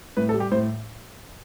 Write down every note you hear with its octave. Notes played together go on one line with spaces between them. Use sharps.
A2 B4
A4
G3
G4
A2 C5